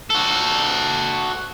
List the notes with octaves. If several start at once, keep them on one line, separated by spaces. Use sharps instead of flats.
F#4 A4